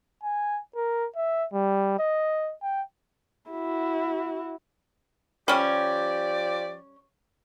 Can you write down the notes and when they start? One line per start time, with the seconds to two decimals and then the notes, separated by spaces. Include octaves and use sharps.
0.23 G#5
0.76 A#4
1.16 E5
1.53 G3
1.99 D#5
2.62 G5
3.51 E4 F#4
5.48 F3 G3 C#4 G4 D5